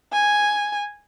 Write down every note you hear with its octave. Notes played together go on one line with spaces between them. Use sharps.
G#5